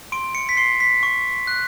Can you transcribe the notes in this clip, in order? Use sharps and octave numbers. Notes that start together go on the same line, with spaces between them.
C6 D7
C#7
B6
C6 C7
B6
C#6
F#6